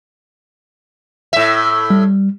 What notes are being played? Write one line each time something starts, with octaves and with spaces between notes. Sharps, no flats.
A2 E5
G3